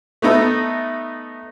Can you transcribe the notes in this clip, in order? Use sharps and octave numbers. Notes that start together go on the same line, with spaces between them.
A3 B3 D#4 A4